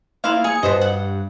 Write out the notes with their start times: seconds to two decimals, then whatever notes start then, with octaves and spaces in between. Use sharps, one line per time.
0.24 A#3 E4 F4 F5
0.44 G#4 C#7
0.63 G2 B2 C5 D#5
0.81 F#5